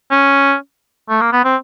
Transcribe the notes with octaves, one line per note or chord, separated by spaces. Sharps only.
C#4
A3
A#3
B3
C4